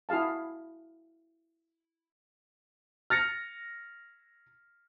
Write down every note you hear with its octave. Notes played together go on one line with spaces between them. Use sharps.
E4 F#4 G#4 F5 A5
F6 A6 A#6 C#7